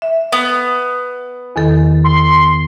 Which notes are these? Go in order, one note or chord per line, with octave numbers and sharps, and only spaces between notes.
E5
B3
E2 D#3 A4
C6